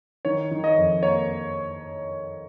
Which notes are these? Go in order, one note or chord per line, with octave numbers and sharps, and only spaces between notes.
D#3 C#5
D#3
D#5
F2
A#3 C#5